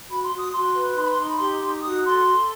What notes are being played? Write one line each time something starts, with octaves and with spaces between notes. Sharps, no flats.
F#4 B5
C6
F#4
D#6
F#4 C6
B4
D#4 C6
B5
C6
D#4
B5
G4 C6
D#4
F#4 D#6
A4 C6
A4